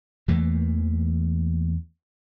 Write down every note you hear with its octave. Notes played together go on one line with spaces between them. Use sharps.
E2 E3 A3 A#3